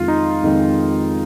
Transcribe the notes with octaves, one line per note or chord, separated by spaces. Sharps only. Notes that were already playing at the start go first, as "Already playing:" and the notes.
Already playing: F2 D#3 G#3 F4
D#4
F2 D#3 G#3